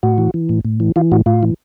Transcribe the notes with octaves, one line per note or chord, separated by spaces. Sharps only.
A2 F#4
E3
E3
A2
A2
E3
E3 F4
A2 F#4
A2 F4
E3